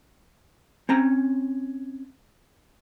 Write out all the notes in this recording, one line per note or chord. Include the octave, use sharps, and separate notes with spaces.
C4 C#4 A#5